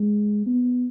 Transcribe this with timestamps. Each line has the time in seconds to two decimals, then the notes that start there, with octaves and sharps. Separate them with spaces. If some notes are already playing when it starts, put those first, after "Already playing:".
Already playing: G#3
0.46 B3